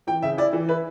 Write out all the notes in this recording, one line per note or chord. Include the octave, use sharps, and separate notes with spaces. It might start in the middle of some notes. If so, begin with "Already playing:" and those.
E3 G5
C#3 E5
E4 D5
E3
E4 B4